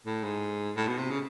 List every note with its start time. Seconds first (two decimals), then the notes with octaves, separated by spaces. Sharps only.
0.06 A2
0.23 G#2
0.76 A2
0.88 B2
0.98 C3
1.11 C#3